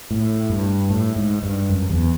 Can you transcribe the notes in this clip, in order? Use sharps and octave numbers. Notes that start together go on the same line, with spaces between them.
A2
G2
A2
G#2
G2
F#2
E2